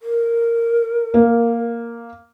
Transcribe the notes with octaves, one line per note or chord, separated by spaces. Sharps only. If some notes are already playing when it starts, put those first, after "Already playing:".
A#4
A#3